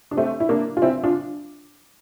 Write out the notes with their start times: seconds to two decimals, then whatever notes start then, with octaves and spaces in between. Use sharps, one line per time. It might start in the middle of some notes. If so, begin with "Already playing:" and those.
0.11 D4
0.17 A3 C4
0.40 E4
0.49 A#3 D4
0.77 F4
0.82 C4 E4
1.04 D4 F4